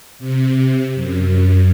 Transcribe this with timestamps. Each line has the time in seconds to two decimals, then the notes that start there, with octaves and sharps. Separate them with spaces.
0.19 C3
0.95 F#2